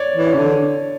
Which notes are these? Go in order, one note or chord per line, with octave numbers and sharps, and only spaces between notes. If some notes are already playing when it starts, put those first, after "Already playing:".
Already playing: C#5 D5
E3
C#5
C#3
D3